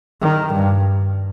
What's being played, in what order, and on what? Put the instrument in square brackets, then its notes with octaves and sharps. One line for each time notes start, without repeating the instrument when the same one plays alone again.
[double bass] D#3
G2